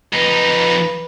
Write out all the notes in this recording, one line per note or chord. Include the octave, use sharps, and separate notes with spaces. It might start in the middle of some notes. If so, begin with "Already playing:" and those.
F2 D#4 B4